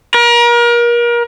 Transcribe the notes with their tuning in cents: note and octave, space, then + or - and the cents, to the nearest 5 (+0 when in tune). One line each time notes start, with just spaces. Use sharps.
A#4 +35